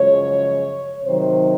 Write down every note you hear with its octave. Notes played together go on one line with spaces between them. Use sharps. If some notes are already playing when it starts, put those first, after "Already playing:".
Already playing: F#2 C#3 F3 G#3 C#5
C3 D#3 F#3 C5